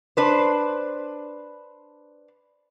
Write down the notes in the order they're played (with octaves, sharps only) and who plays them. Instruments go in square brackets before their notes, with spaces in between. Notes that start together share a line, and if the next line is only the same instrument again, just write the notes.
[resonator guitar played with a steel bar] D4 B4 C5